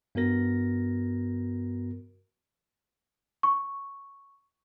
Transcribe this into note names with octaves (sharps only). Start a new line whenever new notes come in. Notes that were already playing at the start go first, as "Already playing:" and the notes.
G2 B3 F#4 A#4 A#6
C#6